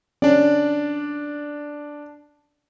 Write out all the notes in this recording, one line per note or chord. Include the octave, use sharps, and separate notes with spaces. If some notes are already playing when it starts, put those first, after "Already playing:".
C#4 D4 D5